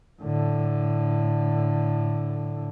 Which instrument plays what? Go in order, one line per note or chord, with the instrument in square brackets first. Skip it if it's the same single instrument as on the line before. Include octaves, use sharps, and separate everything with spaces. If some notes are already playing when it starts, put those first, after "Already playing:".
[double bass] A2 D3